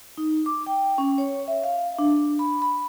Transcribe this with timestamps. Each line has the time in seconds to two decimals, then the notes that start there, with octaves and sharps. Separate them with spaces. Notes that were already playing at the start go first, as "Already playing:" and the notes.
0.17 D#4
0.46 D6
0.67 G5
0.98 C#4
1.18 C#5
1.48 E5
1.64 F5
1.98 D4
2.39 B5
2.62 B5